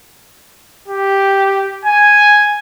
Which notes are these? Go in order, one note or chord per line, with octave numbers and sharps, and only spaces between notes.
G4
G#5